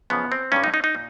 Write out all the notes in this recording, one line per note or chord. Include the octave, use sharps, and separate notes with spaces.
F#2 C#3 F3 B3
C4
G2 D#3 G3 C#4
D#4
D#4
D#4
A#2